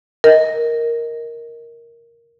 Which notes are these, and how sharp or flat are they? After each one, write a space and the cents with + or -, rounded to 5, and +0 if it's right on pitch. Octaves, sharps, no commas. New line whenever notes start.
A#4 +0 D#5 +20